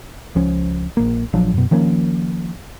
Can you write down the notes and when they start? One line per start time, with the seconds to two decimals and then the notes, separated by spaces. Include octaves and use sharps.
0.35 C#2 F3 C#4
0.97 A#1 A#3
1.33 A#1 F3 F#3 D4
1.54 F#2 B2
1.71 D#3 F3 A#3 C#4